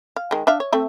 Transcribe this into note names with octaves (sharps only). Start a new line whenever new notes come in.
F5
D#3 G#3
D4 E5 F5
C#5
A3 C4 E5